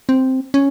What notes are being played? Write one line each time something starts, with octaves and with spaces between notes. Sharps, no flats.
C4
C#4